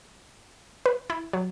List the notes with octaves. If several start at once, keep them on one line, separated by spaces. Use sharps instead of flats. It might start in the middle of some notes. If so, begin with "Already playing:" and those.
B4
E4
F#3